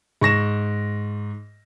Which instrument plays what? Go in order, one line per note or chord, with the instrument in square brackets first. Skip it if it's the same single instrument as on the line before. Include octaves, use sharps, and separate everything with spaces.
[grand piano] G#2 C#6 A#6 E7